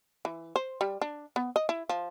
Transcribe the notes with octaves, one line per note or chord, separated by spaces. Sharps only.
E3
C5
G3
D4
B3
D#5
E4
F3